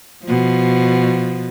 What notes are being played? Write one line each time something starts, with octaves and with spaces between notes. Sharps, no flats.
B2 F3